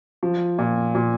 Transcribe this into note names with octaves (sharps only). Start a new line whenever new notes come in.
F3
A#2
A#2